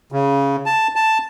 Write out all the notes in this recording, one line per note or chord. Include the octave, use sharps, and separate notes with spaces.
C#3
A5
A5